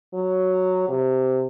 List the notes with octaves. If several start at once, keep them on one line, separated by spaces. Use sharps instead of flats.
F#3
C3